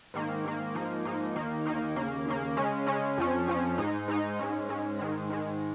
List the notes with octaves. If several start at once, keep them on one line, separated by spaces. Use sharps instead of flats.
G#2 D#3 A#3
G#2 D#3 A#3
G#2 F3 A#3 D#4
G#2 F3 A#3 D#4
D#2 D#3 A#3 D#4
D#2 D#3 A#3 D#4
D#2 C#3 A#3
D#2 C#3 A#3
C#3 G#3 C#4
C#3 G#3 C#4
F2 F3 C#4
F2 F3 C#4
G#2 G#3 D#4
G#2 G#3 D#4
G#2 G#3 C#4
G#2 G#3 C#4
G#2 D#3 G#3
G#2 D#3 G#3